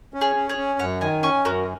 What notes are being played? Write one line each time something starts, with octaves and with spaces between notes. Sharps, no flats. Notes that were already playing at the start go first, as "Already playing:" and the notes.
C#4
G#4 C#5
C#4
G#4 C#5
C#4
F#2 C#5 F#5
D#3 D#5 G#5
C#4 G#5 C#6
F#2 F#4 A#4